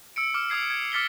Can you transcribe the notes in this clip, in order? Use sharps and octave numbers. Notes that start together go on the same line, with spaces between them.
E6 C#7 D7
D6 F6
D#6 E6 G#6 C7
G#6
D6 F6 A6 B6 C#7 G7